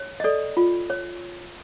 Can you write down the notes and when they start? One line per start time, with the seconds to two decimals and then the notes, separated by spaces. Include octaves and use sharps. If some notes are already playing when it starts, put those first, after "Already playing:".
Already playing: C#5
0.20 D#5
0.24 A4 D5
0.57 F4
0.90 C#5